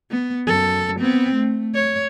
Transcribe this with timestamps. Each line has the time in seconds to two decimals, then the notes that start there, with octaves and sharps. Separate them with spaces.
0.11 B3
0.47 F#2 A4
1.00 B3 C4
1.36 A3
1.74 C#5